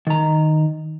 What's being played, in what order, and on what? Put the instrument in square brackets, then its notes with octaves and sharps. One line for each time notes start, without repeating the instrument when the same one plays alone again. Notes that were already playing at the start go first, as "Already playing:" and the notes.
[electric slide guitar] D#3 A#5